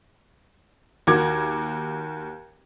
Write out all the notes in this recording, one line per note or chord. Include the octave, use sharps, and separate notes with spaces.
D#2 F#4 A#4 D6 G#6